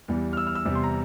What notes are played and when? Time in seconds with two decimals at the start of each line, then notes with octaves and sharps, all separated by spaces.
0.08 E2 E3 G3
0.33 F6
0.37 E6
0.47 F6
0.55 E6
0.65 E2 C3 G3
0.75 C6
0.84 A#5